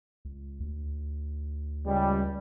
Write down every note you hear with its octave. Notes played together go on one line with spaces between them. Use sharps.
C#2
D2
C#2 G3